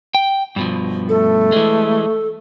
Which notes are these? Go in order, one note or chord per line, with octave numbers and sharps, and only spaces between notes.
G5
G2 B2 F3
A3 A4
E3 G#3